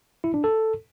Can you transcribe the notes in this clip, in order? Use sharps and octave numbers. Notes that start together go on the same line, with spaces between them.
E4
D4
A4